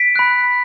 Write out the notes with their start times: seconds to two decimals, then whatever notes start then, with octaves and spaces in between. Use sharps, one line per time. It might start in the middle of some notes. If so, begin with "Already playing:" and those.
Already playing: B6 D7
0.16 B5 F#6